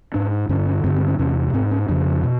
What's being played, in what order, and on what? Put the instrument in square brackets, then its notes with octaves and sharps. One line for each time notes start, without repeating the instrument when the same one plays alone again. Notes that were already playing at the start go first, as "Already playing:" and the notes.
[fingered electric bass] G#2 D4
G2 D3 C#4
C#4
G2 D3 C4
C4
C#4
E2 C3 C#4
G#2 C4
C#4
F2 C#3 D4
B2